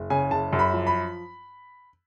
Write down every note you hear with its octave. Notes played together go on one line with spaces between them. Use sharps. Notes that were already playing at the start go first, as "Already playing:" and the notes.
Already playing: F#1
C#3 G#5
F#1 A5
F#2
B5
F3
B5